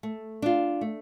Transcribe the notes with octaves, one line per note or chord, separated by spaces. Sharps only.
A3
D4 F4
A3